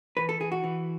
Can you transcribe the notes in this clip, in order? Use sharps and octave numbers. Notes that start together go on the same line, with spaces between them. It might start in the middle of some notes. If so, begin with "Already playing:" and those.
E3 B4
A4
E3 G#4
F#4
E3